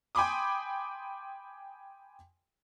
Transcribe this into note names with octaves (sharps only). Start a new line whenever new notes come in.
G5 G#5 B5 C6 D6 D#6